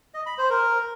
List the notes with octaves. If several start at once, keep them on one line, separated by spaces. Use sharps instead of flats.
D#5
B5
C5
A#4